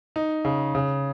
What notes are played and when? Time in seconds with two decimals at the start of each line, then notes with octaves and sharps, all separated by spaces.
0.16 D#4
0.45 C#3
0.75 C#3